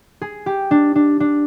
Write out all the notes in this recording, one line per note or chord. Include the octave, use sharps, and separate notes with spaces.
G#4
G4
D4
D4
D4